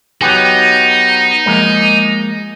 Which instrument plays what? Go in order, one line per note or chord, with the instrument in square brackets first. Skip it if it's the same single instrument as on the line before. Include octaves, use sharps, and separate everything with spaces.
[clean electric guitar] F#3 B3 G4 [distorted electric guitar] D#4
[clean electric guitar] F3 G#3 A#3